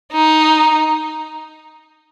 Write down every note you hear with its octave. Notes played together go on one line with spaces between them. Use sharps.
D#4